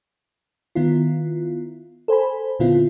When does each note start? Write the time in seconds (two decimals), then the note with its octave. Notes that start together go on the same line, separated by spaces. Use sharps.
0.75 D#3 B3 E4 F4
2.08 A4 C5 G#5 B5
2.60 A#2 D3 B3 C4 E4 F4